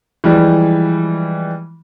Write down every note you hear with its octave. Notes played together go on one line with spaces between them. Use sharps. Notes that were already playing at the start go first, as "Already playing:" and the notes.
E3 F3 G3 G#3